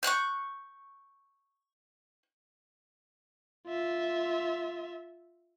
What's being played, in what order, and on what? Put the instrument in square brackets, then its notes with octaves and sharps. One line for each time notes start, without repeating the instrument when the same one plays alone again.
[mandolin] C#6 D6 F#6 G6
[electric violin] F4 E5